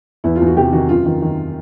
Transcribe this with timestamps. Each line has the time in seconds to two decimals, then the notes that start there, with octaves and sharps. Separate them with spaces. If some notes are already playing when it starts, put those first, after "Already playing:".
0.24 E2 E4
0.36 F4
0.41 E2
0.47 F#4
0.57 C3 G4
0.73 D#3 F#4
0.89 F#2 F4
1.06 D#3
1.22 D#3